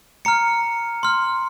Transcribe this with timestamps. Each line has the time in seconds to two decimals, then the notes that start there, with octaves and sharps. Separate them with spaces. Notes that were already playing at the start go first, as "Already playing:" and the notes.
0.25 A#5 F6 C#7
1.03 C6 F6